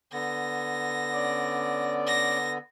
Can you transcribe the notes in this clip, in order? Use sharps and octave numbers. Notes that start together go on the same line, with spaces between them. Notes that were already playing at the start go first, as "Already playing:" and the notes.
D3 B3 A#6
C#4 D5
A#6